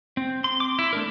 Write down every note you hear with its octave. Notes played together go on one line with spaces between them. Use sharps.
C4
C6
D6
E4
A3 D4 A#4